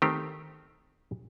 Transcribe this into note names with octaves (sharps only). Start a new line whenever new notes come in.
D#3 A3 C4 G4